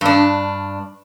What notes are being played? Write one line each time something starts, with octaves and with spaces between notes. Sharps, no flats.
G2 D4